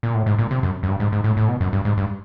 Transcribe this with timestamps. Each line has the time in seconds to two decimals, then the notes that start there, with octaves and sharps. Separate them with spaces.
0.03 A#2
0.15 A2
0.26 G#2
0.38 A#2
0.51 C3
0.63 F#2
0.83 F#2
0.88 G2
1.00 G#2
1.12 G#2
1.24 A2
1.37 A2
1.48 B2
1.61 F#2
1.73 G2
1.85 G#2
1.97 G2